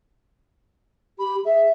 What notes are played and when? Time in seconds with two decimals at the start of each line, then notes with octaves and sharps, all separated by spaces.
1.18 G4 B5
1.44 G#4 E5